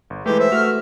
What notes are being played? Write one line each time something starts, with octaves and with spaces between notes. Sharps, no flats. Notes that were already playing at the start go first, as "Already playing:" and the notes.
G1
E3 G#3 A3 G4 B4
C5 E5
A3 F#4 F6